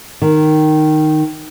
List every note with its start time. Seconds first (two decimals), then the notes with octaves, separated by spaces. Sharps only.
0.22 D#3